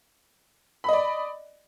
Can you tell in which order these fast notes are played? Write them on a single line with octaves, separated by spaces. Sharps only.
B5 D#5 D5